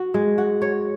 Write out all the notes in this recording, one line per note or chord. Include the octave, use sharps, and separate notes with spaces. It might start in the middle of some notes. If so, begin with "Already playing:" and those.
Already playing: F#4
G#3
F#4
C#5